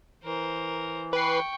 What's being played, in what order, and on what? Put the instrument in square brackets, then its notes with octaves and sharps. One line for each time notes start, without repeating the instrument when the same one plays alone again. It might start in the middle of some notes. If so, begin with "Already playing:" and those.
[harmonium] E3 [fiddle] A#4 C5
[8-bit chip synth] B4 C7 [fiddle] G5 C#6